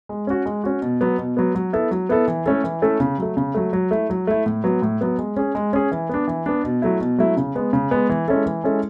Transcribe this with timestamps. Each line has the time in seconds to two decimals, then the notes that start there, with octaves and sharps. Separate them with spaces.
0.09 G#3
0.27 C#4 F#4
0.46 G#3
0.64 C#4 F#4
0.82 B2
1.01 F#3 B3
1.18 B2
1.37 F#3 B3
1.55 F#3
1.73 B3 E4 A4
1.91 F#3
2.09 B3 E4 A4
2.28 E3
2.46 A3 C#4 E4 A4
2.64 E3
2.82 A3 C#4 E4 A4
3.00 C#3
3.18 F#3 A3
3.37 C#3
3.54 F#3 A3
3.73 F#3
3.91 A3 E4
4.10 F#3
4.27 A3 E4
4.46 A2
4.64 F#3 B3
4.82 A2
5.01 F#3 B3
5.19 G#3
5.37 C#4 G#4
5.55 G#3
5.73 C#4 G#4
5.92 E3
6.09 B3 D4
6.27 E3
6.46 B3 D4
6.64 B2
6.82 F#3 A3 E4
7.00 B2
7.18 F#3 A3 E4
7.37 C#3
7.55 G#3 B3
7.73 C#3
7.91 G#3 B3
8.09 E3
8.28 G#3 C#4 E4 A4
8.46 E3
8.64 G#3 C#4 E4 A4